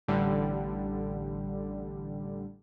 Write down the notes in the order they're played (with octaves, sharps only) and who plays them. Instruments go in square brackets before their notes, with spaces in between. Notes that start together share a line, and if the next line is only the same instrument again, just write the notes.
[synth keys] A1 D3 G3